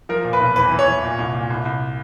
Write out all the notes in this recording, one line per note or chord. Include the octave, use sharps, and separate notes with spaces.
F3 A#4
A#2
B4
B1
E2 B4
E3
C#5
E3
A#2
C2
A#2
C2
C2